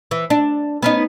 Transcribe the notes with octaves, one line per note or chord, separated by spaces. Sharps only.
E3
D4
B3 C#4 D#4